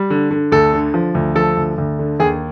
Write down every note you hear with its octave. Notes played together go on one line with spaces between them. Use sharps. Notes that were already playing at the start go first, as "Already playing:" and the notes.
Already playing: G3
D3
D3
D2 A4
D3
F3
D2
F3 A4
D2
D2
D3
D#2 G#4